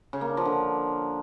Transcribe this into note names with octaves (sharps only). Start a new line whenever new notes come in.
C#3
A#3
D4
F3
D3